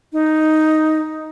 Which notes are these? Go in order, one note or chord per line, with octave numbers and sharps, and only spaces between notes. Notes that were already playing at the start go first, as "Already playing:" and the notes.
D#4